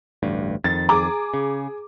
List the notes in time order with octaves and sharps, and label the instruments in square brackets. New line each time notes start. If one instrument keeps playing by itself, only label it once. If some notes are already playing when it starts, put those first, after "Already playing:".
[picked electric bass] A1 D2 G2
[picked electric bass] F2 D#3 [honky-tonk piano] A6
[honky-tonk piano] G#4 D6 [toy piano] A#5
[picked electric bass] C#3